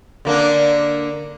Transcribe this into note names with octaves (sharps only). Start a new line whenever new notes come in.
D3 A#3 D4